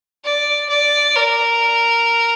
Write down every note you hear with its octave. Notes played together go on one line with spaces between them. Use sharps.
D5
D5
A#4